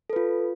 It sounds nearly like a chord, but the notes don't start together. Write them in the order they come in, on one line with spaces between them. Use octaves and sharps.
A4 B4 F4